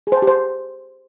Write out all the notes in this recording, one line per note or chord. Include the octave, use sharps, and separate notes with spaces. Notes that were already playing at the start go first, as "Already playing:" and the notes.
G#4
C5
A5
G4
C5